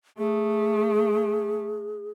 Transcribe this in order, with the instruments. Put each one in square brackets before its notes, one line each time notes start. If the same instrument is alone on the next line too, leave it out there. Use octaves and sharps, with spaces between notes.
[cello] A3 [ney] G#4